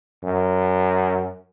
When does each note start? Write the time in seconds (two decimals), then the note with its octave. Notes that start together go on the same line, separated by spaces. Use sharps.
0.24 F#2